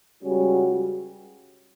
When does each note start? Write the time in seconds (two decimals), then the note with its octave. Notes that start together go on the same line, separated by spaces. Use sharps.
0.24 C#2 C#3 G3 C#4 F#4